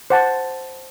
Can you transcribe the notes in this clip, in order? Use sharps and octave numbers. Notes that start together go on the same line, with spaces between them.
C5 F#5 A5